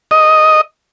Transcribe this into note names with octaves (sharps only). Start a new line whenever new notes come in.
D#5